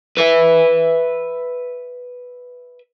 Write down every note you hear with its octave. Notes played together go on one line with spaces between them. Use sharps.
B4 E5